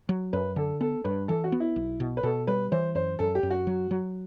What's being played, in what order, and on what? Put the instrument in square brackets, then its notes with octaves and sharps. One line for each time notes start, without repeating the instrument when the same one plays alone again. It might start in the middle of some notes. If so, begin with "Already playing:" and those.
[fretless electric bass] F#3
[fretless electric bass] F#2 [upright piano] B4
[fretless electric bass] D3 [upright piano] A4
[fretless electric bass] B3 [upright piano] A4
[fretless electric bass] G2 [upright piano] B4
[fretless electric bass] E3 [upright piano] A4
[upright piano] F#4
[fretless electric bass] B3
[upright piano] E4
[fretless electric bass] B1
B2
[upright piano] B4
[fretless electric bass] B2 [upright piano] A4
[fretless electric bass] G3 [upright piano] B4
[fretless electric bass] E3 [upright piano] C5
[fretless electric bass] F#2 [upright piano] C5
[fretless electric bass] F#2 [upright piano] A4
[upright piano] G4
[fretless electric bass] F#2
[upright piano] F#4
[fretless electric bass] F#3
F#3